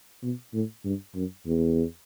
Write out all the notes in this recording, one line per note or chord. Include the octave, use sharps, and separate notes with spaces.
B2
A2
G2
F#2
E2